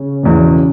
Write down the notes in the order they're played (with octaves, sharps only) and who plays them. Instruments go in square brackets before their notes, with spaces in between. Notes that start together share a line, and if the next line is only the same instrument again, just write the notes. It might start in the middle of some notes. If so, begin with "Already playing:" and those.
Already playing: [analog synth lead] C#3
[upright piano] E2 B2